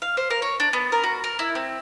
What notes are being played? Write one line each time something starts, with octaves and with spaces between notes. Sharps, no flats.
F5
C5
A#4
C#5
D4
B3
A#4
F#4
A#4
E4
C4